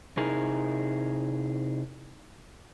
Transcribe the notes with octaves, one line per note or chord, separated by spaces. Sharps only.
C3 D#4 E4 G#4 A#4